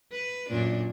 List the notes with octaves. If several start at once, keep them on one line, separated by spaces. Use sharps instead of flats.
B4
F#2 A#2 D4